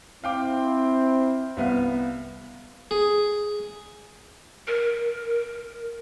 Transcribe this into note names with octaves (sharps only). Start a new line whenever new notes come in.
C4 E4 F5 G5 D6
C2 B3 F5
G#4
A#4